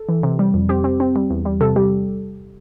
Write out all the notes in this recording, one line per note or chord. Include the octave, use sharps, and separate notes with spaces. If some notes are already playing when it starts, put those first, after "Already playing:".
Already playing: A4
E3
C3
G3
F2
C4 G4
C4
C4
G3
E2
G3
C3 A4
G3 G4